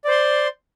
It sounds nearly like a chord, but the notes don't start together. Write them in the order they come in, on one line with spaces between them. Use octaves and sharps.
D5 C5 C6